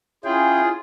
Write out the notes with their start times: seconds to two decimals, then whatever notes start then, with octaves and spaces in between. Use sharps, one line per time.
0.24 C#4 E4 F4 G#4 G5